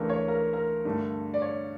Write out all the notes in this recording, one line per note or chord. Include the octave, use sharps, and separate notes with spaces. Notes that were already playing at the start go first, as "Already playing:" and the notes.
Already playing: C#2 C#3 E3 A3 D4 A#4
C#5
A#4
A#4
G2 D3 A3
D5
C#5